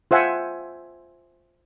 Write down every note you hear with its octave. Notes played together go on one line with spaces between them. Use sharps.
F4 C5 E5 F#5 G#5